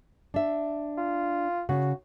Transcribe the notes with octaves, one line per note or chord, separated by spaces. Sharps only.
D4 E5
F4
C#3 F#4